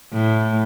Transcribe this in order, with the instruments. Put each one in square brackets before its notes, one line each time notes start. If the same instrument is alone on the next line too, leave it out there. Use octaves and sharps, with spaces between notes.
[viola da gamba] A2